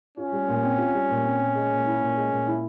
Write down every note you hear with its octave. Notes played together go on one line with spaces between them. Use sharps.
C#4 F4
G3
A#2
C4
F4
G3
A#2
C4
A#2
G#3
A#2
E4
A#2
G#3
A#2
E4